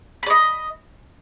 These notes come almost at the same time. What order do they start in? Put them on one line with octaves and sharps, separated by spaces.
B5 D5 D#5